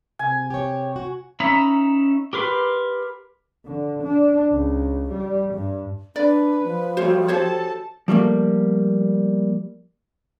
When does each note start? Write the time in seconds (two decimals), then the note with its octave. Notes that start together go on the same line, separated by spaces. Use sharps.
0.19 C3 G#5
0.50 G4 C#5
0.96 F#4
1.40 C#4 D#4 E5 A#5 B5
2.33 G4 A#4 B4 C6
3.65 D3
4.03 D4
4.52 C#2
5.10 G3
5.54 G2
6.16 D4 B4 D5
6.63 F3
6.97 G3 A3 F#4 C5 C#5
7.28 G4 A4 C5 C#5 A5
8.08 F3 G3 A3 A#3